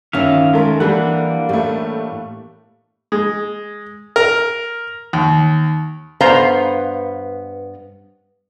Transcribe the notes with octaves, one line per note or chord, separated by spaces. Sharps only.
G1 D#3 C#4 E5 F5
G#3 A3 A4 A#4
D3 E3 G3 A#3 D4 F#5
A2 G3 A3
G#3
A#4
D#2
G2 B3 C5 F5 A#5